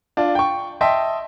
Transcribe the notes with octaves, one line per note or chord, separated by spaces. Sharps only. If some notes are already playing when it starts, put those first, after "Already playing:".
D4 F4
G5 C#6
D#5 E5 G5 A5 C6